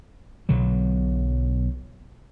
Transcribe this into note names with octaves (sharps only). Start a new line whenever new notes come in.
B1 B2 D3 F#3